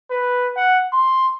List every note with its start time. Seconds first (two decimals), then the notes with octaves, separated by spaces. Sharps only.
0.11 B4
0.56 F#5
0.93 C6